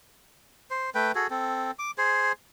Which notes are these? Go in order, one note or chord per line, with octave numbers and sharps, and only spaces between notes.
C5
A3 B4 G5
F#4 G#4 A4
C4 A4
D6
G#4 C5